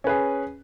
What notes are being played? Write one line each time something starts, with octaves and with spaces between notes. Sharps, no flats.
C#4 G#4 B4